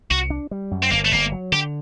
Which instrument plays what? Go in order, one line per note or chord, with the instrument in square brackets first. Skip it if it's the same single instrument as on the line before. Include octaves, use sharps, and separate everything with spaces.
[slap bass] C2 [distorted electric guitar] F#4
[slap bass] D4
G3
F#2
[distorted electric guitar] C4
[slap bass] G1 [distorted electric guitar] A#3
[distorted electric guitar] A3
[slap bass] G1 [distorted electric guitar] A#3
[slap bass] F#3
[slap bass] D3 [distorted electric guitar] G4